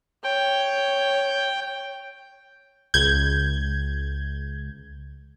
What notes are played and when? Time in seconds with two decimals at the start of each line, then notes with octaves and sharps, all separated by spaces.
0.24 C#5 G5
2.94 C#2 G6 G#6